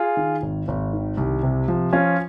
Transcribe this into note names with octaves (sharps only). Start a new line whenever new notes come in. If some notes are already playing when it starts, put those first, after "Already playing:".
Already playing: F4 G#4
D#3
G#1
G#1
D#3
C2
C3
F3
F3 C#4 F4